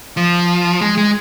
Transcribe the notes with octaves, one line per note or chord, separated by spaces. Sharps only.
F3
G#3
G#3